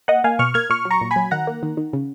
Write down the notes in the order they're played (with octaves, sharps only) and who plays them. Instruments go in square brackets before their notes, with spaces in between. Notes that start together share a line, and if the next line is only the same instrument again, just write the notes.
[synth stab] A#3 D#5 F#5
A#3 F5 G#5
B2 C#6 F6
A#3 F6 G#6
A#2 C#6 F6
F#3
A#5 C#6
A#2
G#5 B5
F#3
D#3 F#5 A#5
A#3
D#3
D#3
C#3